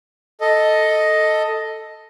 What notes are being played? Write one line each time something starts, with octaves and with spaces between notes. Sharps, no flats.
A4 D#5